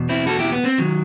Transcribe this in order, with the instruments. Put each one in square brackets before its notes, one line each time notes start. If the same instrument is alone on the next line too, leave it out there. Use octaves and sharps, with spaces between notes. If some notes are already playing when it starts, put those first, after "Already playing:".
Already playing: [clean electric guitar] E2 B2
C4 E4
F#4 A4
E4 G4
B3
C4
D#3 F#3